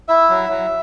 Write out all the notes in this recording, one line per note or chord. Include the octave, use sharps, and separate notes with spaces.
E4 E5
F#3
F#3